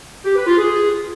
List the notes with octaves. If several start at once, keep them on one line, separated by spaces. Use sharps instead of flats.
G4
B4
F4
G#4